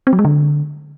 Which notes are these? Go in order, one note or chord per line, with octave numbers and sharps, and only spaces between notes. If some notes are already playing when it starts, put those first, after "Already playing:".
C4
F#3
G#3
D3